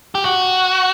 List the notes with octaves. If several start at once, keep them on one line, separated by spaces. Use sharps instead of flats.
G4
F#4